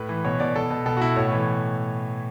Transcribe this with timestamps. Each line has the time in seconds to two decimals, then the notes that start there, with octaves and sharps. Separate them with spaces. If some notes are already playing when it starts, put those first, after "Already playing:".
Already playing: A2 B4
0.09 E3
0.24 B2 C#5
0.40 B2 D5
0.55 B2 A4
0.70 B2
0.86 B2 A4
0.97 F#4
1.01 B2 E4
1.16 A2 C#5
1.32 E3